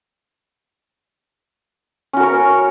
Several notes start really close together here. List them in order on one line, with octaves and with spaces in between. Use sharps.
C#4 F#4 A#4 C#5